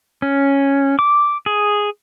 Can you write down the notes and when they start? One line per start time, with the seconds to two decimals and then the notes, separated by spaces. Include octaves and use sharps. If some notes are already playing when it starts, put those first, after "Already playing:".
0.22 C#4
0.99 D6
1.46 G#4